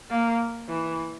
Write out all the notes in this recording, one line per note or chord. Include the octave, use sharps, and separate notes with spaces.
A#3
E3